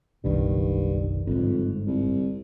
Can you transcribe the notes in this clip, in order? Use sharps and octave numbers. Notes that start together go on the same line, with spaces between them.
F#1 B1 G2 D#3
G1 F2 G#2
C2